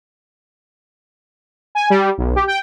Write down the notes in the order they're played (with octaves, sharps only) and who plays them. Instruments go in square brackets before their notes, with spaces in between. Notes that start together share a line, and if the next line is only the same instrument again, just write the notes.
[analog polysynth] G#5
G3
B1
G4
G5